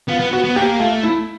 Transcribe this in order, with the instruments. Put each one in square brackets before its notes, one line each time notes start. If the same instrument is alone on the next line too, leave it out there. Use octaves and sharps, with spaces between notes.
[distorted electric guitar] B3 [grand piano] F4
[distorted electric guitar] B3
[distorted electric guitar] B3 [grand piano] F#4
[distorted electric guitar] B3
[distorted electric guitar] A#3 [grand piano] G4
[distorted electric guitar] A3 [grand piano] F4
[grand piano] E4